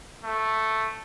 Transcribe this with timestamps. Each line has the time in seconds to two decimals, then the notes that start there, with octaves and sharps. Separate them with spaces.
0.24 A3